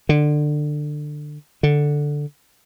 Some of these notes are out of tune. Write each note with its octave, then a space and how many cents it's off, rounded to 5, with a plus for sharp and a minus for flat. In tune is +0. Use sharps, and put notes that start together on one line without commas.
D3 +20
D3 +0